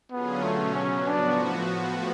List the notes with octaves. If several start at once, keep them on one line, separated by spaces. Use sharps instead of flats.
D3 F#3 B3 C#4 F4 G#4
B2 F#3 A3 C#4
C#3 F#3 B3 C#4
A2 F3 B3 D4 F#4